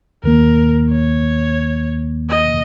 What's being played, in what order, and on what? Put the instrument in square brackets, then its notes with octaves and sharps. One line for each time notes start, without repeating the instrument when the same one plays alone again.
[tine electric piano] D#2 D#3 A#3 [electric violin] A#4
[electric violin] C#5
D#5